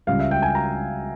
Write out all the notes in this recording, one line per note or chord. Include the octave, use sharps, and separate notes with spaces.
C#2 C#3 G3 F5
E5
G5
G#5
A#5